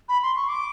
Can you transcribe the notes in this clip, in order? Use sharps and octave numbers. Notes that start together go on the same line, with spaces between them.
B5
C6
C#6
D6